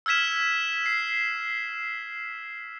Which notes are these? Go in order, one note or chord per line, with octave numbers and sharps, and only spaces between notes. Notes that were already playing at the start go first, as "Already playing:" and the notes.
E6 F6 G#6 B6 E7
C7